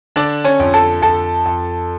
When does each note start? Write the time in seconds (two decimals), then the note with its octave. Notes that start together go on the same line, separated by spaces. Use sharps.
0.16 D3 D4 D5
0.44 C#4 C#5
0.60 F2
0.74 A4
1.02 F2 A4
1.45 F2